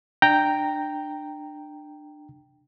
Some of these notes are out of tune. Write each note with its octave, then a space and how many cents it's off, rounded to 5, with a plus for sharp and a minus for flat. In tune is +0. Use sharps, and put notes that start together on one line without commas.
D4 +25 G5 +0 A#5 -10